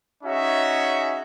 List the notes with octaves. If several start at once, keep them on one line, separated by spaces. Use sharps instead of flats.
C#4 D#4 F#4 G#4 E5